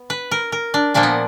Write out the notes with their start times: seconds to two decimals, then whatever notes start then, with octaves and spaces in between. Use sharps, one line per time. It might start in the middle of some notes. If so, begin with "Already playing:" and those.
Already playing: B3
0.10 B4
0.31 A#4
0.52 A#4
0.74 D4
0.94 A#2 F3 A#3 D4
1.03 B3